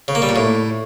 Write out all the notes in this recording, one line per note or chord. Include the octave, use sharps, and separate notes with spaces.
C#3
A#3
G3
A#2
A2